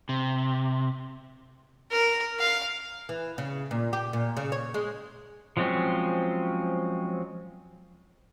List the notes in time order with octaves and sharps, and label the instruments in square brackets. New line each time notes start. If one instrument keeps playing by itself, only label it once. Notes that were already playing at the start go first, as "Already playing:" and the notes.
[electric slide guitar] C3
[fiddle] A#4
F5
[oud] E3
C#3
A#2
G4
A#2
C#3
C#5
G#3
[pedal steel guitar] F3 F#3 G#3 C4 C#4